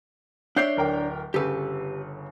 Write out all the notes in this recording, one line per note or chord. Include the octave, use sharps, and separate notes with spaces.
D4 C#5 D5 E5 G6 C7
D1 A#4 G5
G1 C#3 G4 A4 B4